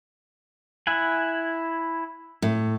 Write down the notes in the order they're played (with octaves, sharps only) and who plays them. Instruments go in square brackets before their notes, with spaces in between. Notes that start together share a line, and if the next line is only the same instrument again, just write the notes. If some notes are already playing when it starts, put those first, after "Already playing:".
[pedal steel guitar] E4 F#5 G#5
[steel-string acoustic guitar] A2